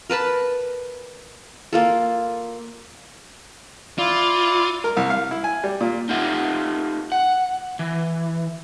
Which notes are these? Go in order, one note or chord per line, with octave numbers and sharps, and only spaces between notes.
A#4 B4 A5 B5
A#3 F4 A4
E4 F4 D5
A#4
C2
F5
E4
G#5
G3
A#2
D#4 F4 G4 A4 E5 F#5
F#5
E3